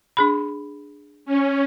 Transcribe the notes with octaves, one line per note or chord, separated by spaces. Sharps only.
D4 G#4 B5
C#4